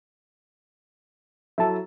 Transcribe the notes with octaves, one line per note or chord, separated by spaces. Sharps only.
F#3 E4 A4 E5 A5